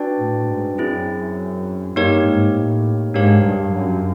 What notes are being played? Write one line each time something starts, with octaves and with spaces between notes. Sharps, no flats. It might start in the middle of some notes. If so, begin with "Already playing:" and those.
Already playing: D4 F#4 B4 D5 G5
A2
G#2
F#2 C4 E4 G#4
G2 A#3 D#4 G4 A#4 C#5
G#2
A2
G#2 D4 G4 A#4 C#5 F5
G2
F#2